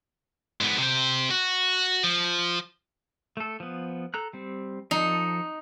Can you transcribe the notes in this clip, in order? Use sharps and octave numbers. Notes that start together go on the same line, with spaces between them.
G#2 B3
C3 C5
F#4
F3
A3 A4
F3 B3
A4 A#5 F#6
G3 C4
F3 D#4 A4